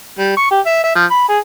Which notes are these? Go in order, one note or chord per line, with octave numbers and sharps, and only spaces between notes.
G3
C#6
G4
E5
E5
F3
B5
G#4